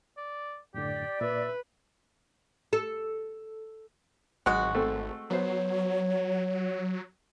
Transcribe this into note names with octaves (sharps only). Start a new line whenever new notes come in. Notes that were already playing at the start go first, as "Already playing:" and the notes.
D5
F#2 A2 D3 G4 D5
A#2 B4 E5
A4
G#1 F#3 G#3 F#4 F#5
A3 C4 A4
F#3 B3 C5 C#5